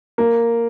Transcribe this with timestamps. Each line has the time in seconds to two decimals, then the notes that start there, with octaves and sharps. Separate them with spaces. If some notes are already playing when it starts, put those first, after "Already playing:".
0.18 A#3